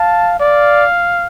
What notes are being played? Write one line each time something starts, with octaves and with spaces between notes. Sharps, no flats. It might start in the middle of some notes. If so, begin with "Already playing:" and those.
Already playing: F5 A5
D5 F5